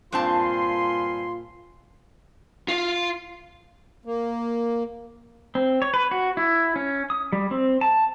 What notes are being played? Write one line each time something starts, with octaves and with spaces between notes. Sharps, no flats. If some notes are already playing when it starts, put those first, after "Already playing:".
G2 A#2 C4 F4 G#5 A5 B5 C6
F4 F5
A#3
C4
C#5
B4
F#4
E4
C#4
D#6
G3
C4
A5